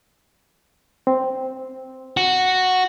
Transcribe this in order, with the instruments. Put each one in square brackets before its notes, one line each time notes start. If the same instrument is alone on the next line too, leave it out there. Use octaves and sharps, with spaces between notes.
[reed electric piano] C4
[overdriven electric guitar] F#4